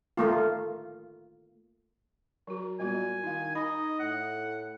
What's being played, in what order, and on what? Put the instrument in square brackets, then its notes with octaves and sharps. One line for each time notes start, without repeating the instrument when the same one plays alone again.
[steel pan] A3 A#3 F4
[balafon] F#3 F#4 [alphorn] A#4
[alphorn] A#2 [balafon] G3 B3 F#4 [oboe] G#5
[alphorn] D#3 [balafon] E4 F5
[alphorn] D#4 [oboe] D#5 [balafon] B5
[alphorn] A2 [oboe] F#5